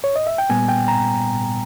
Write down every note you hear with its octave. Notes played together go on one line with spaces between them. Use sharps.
C#5
D#5
E5
G5
A#2 G3 B3 G#5
G5
A#5